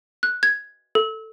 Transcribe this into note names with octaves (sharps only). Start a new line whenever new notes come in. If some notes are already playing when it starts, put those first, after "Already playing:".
F#6
G#6
A4